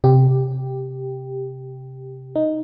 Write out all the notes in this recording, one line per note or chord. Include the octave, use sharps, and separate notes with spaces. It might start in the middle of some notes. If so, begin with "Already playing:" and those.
C3 G4
D#4